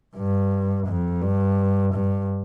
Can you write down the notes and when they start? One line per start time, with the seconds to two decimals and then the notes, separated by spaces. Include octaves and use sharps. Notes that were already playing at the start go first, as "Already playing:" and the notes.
0.16 G2
0.87 F2
1.22 G2
1.93 G2